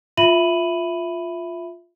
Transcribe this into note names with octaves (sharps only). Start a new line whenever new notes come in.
F4 E5 B5 D#7 F#7